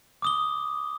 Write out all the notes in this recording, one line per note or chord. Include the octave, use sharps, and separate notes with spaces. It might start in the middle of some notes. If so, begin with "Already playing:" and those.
D6 D#6 G7